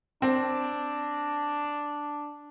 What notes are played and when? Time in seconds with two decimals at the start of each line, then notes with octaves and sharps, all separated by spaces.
0.22 C4 D4